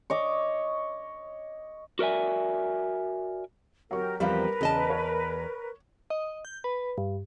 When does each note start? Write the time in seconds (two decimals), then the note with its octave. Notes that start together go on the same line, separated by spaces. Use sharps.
0.10 C#5 D#5 D6
1.99 F#4 A#4 D5 E5 G#5
3.91 F#3 G4 A#4 C#6
4.20 E2 F3 G3 C4 A#4 B4 F5
4.61 E2 C#3 D#5 A5
4.90 C#5
6.10 D#5
6.45 G6
6.64 B4
6.98 G2